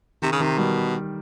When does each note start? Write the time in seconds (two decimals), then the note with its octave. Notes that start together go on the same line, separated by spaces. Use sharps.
0.22 C3 D#3
0.32 C#3
0.40 C3 D#3
0.58 B2 G3